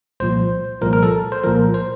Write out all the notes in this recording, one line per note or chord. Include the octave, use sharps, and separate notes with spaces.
C2 A#2 F3 C5
C2 A#2 F3 A#4
A#4
A4
C5
C2 A#2 F3 A#4
C5